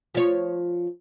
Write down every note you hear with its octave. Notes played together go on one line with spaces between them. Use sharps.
F3 C#5